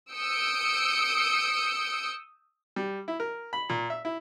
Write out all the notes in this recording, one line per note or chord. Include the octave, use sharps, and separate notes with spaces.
D#6 E6 G6 C#7 D7
G3
E4
A#4
B5
A#2
E5
E4